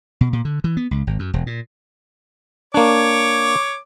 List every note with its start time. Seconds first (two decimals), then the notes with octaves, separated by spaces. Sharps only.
0.21 B2
0.33 A#2
0.45 D3
0.64 E3
0.77 B3
0.91 C#2
1.07 G#1
1.19 F#2
1.34 E1
1.47 A#2
2.74 A#3 D4 C#5 D6